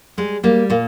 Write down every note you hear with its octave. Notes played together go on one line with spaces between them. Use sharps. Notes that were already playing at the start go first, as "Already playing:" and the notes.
G3 G#3
G3 A#3
A#2 A#3